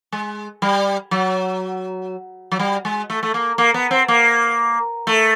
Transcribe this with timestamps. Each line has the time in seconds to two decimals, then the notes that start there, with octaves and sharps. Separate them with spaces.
0.12 G#3
0.62 G3
1.11 F#3
2.52 F#3
2.59 G3
2.85 G#3
3.10 A3
3.23 A3
3.34 A#3
3.58 A#3
3.74 B3
3.91 C4
4.08 A#3
5.07 A3